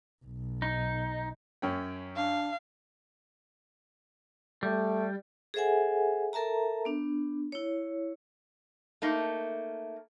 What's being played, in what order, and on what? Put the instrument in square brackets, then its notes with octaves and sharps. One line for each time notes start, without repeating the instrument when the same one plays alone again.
[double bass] B1
[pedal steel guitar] D#4
[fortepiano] F#2 C#4 G5
[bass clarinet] D4 [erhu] F5
[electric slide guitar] G3 [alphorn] A3
[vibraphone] G#4 A4 C5 E5 F#5 G#5
A4 A#4 E5 A5 A#5
B3 D4
E4 C#5
[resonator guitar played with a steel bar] A3 A#3 D#4